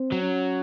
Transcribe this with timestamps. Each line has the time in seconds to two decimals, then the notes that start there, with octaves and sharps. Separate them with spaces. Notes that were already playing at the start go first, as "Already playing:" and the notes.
Already playing: C4
0.12 F#3
0.22 C#4